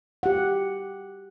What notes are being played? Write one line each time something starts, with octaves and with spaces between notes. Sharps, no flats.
G4 F#5